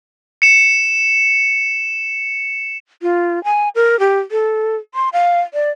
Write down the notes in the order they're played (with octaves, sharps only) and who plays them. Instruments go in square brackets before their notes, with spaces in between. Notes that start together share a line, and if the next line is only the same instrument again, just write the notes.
[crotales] C#7 E7
[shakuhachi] F4
G#5
A#4
G4
A4
C6
F5
D5